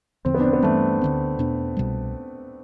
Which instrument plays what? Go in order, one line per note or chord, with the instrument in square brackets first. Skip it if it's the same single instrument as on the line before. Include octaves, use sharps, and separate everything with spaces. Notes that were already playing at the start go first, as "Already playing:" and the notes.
[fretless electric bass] E2 D3 F3 [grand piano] C4
[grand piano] B3
D4
C4
B3
[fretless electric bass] G2 E3 G3 [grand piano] A3
[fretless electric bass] D2 D3 F3 C4
E2 B2 B3 D4
C2 B2 G3